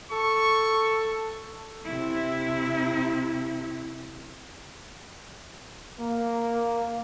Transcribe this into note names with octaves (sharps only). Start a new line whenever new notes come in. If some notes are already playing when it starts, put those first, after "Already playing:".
A4 C#6
C3 E4
A#3